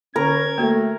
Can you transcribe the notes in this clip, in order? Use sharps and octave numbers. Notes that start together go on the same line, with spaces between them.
D3 C#4 A#4 G#6
A3 A#3 F#4 A4